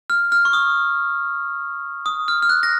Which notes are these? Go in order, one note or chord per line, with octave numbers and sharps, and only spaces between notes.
F6
F6
C#6
D#6
D#6
F6
F6
F#6
A#6